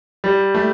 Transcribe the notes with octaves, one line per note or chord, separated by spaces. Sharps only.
G3
A3